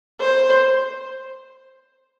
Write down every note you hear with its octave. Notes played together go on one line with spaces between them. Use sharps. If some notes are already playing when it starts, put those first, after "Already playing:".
C5